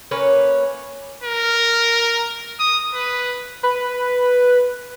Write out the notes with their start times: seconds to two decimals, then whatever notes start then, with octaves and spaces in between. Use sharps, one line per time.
0.11 A#3 C#4 B4 C#5
1.23 A#4
2.60 D#6
2.94 B4
3.63 B4